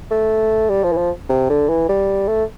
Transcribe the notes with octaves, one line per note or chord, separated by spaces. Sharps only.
A3
G3
F3
E3
F3
C3
D3
E3
G3
A3